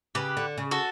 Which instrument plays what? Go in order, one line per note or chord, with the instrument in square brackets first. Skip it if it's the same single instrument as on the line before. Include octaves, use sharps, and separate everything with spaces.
[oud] C#3 [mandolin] G4 B4
[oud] D3
C#3
[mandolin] F#4 A4